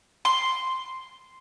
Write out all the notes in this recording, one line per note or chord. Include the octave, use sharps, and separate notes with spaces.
C6